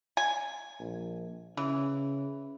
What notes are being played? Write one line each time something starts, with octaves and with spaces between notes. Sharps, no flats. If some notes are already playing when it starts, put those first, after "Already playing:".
G#5
A#1
C#3 E3